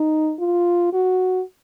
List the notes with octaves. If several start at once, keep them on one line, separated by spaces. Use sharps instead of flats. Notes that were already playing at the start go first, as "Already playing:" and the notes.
Already playing: D#4
F4
F#4